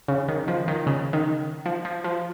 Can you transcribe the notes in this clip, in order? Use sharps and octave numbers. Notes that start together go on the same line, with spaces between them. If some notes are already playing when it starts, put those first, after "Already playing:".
C#3
D#3
F3
D#3
C#3
D#3
F3
F3
F3